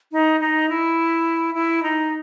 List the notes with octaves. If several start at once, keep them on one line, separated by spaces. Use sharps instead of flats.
D#4
D#4
E4
E4
D#4